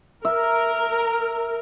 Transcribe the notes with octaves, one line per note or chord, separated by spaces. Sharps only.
A#4 E5